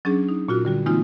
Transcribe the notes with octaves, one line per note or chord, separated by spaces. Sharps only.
F#3 C#4 D4 G#4
D#4
A#2 F4 F#4
D3 G3 F#4
E3 G#3 A#3 C4 D#4 F4